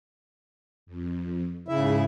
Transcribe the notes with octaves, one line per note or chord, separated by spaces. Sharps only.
F2
G#2 C#3 E4 G#4 E5